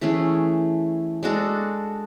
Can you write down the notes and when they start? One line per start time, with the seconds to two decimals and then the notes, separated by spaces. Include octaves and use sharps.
0.01 E3 A3 C#4 G#4
1.23 G#3 D4 F#4 A4